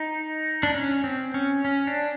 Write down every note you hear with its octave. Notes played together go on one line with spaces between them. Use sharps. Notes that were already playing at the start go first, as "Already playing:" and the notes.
Already playing: D#4
D4
C#4
C4
C#4
C#4
D4